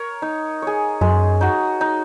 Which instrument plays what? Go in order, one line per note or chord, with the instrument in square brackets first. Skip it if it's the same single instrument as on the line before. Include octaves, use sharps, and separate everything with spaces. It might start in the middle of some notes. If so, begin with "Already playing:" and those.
Already playing: [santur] A#4 C#5
D#4
G#4 C#5
[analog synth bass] F#2 [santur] G#3
[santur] D#4 F#4
D#4